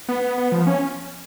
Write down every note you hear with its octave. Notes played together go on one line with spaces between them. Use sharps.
B3
B3
B3
F3
C#4